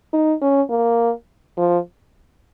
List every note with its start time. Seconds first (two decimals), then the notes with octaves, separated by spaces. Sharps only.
0.13 D#4
0.42 C#4
0.70 A#3
1.57 F3